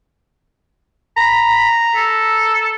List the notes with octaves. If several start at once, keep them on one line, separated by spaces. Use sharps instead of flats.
A#5 B5
A4